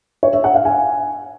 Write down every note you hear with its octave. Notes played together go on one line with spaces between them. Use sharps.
C#5
E5
F#5
F5
G#5